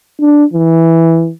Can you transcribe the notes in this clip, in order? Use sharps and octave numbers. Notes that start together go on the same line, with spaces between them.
D4
E3